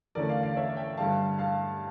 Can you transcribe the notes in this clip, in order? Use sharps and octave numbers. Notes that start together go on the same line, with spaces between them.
E2 D3 A3 C#4 A#4 D5
D5 F5
D5 F5
C#5 E5
E5 G5
G2 D3 G3 F5 A5
F5 A5